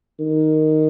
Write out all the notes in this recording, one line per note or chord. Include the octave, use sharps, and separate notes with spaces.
D#3